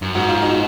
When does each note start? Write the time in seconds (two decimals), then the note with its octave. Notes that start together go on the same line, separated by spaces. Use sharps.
0.02 F#2
0.15 G#2 F#4
0.29 F4
0.42 D#4 F#4